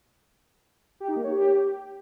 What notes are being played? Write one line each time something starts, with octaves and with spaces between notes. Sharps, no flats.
G4
D#4
A#3
C#5
G4